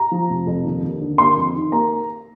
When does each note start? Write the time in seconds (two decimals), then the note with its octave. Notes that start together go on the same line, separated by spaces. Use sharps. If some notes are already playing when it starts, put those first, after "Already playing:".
Already playing: A#5
0.11 F3
0.29 F1
0.47 F2
0.65 D#2
0.82 D#2
1.01 D3
1.18 A#3 C6
1.36 F2
1.55 D#3
1.72 A#3 A#5